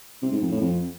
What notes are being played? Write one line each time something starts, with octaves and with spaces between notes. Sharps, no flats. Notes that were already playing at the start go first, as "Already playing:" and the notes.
C3
G#2
F2
A2
F2